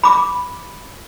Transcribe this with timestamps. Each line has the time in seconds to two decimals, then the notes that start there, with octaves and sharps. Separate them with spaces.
0.04 B5 D6